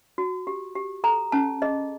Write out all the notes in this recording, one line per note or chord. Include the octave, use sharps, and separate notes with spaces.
F#4
G4
G4
A4 A#5
C#4 A5
G#4 D#5